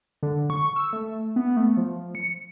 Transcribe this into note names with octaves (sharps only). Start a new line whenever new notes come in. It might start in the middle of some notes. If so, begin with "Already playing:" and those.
D3
C#6
E6
A3
B3
A3
F3
C#7